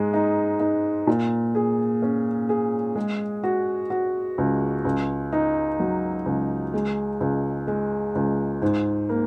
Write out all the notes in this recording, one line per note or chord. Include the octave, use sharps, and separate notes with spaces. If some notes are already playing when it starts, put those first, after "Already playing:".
Already playing: G#2 G#3
D#4
D#4
A#2
G#4
C#4
G#4
G#3
F#4
F#4
C#2
C#2
D#4
F#3
C#2
G#3
C#2
G#3
C#2
G#2
A#3